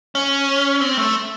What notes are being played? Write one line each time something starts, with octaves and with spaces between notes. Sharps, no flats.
C#4
C4
A3